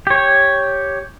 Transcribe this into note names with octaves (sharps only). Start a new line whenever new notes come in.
G4 C#5